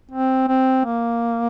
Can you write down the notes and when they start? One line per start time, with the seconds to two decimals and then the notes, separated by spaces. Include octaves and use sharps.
0.11 C4
0.48 C4
0.85 A#3